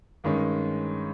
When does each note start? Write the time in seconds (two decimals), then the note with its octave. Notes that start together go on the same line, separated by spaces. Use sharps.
0.24 G2 D#3 G#3 C#4